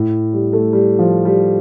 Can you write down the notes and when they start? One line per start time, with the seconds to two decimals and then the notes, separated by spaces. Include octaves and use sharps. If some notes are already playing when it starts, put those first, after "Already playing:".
Already playing: A2
0.33 G3
0.53 A3
0.73 G3
0.99 F3
1.25 G3